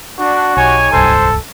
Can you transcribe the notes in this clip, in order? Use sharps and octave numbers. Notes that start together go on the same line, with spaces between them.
D4 F#4
B1 D#4 G4 C#5 G#5
D1 C2 G2 A4 C5